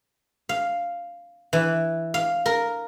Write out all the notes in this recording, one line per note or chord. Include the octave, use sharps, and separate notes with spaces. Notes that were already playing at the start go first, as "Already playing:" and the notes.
F5
E3
F5
A#4